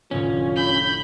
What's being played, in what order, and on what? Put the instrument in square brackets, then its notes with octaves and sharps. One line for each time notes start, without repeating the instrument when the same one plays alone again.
[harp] F1 A2 D3 [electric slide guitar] C#4 [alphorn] F4
[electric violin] B5 G6 [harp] B6